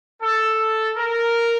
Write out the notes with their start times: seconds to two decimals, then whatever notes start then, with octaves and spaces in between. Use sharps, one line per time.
0.21 A4
0.97 A#4